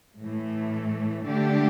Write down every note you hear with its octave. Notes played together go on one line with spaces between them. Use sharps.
A2 E3 A3
D3 A3 D4 G4